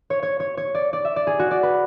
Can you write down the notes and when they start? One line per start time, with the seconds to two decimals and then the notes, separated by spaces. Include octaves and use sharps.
0.10 C#5
0.23 C#5
0.40 C#5
0.57 C#5
0.75 D5
0.93 D5
1.05 E5
1.16 D5
1.27 G#4
1.39 F#4
1.51 D5
1.63 B4